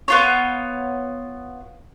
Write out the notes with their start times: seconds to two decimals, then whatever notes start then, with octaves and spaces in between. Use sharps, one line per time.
0.08 B3 F4 C#5